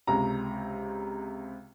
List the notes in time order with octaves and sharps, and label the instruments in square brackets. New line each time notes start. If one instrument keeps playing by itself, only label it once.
[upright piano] C#2 C3 A#5